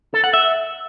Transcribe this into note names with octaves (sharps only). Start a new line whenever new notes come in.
A4
F#5
E5